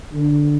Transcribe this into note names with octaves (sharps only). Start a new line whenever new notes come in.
D3